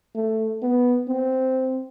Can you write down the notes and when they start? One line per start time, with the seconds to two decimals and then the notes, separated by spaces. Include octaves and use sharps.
0.15 A3
0.62 B3
1.09 C4